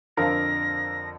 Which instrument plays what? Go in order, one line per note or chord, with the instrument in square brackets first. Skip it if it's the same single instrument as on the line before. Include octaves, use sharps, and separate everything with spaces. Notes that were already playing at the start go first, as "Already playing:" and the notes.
[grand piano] F2 D3 F3 [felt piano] A#4 F5 [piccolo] A#6